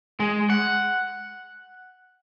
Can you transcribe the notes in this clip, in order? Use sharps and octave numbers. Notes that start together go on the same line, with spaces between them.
G#3
F#5